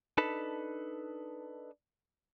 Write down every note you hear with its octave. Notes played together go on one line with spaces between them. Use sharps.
D4 D#4 A4 B4 A5 B5